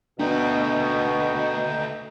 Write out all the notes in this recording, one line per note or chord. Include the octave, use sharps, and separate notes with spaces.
B2 D3 A3 D4 D#4 G5